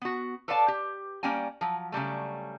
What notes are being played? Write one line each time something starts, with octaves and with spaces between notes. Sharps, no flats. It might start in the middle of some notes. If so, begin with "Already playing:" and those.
B3 F#4
A4 B4 C#5 D5 F5 A5
G4
G3 A#3 C#4 G5 G#5
F3 F#3
C#3 F#3 G3 A3